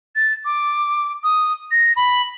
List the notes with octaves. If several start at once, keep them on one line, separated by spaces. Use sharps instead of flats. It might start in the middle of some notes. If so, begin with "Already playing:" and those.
A6
D6
D#6
A#6
B5